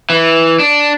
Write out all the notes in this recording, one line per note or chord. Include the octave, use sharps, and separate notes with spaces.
E3
D4